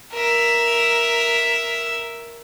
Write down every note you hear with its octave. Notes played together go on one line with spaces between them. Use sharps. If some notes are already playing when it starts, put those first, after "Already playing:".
A#4 E5